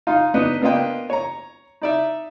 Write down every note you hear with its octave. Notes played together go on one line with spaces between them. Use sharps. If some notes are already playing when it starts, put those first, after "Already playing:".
D#4 F4 F5
B3 D4 D#4 B4 D#5
A#3 B3 D4 F4 D#5 G5
C#5 A#5
D#4 D5 E5